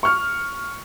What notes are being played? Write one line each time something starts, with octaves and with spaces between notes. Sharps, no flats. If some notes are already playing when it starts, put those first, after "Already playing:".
C#6 F6